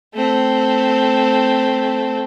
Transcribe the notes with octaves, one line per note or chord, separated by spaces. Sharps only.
A3 C4